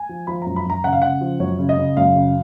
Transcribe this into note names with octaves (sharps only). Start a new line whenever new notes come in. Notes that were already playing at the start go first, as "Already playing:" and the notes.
Already playing: G#5
F3
F3 B5
F#2 A#5
B5
F#2 A#5
C#3 F#5
F5
C#3 F#5
F3
F#2 C#5
C#3
D#5
C#3
F#2 F5
C#3